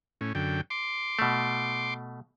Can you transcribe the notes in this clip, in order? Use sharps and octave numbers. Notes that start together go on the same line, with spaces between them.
A2 C#4
F#2 D3 G5
C6 D6
B2 A3